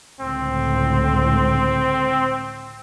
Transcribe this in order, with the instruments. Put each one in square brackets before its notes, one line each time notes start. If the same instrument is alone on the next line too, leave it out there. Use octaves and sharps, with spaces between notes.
[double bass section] C#2 A2 D3 [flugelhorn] C4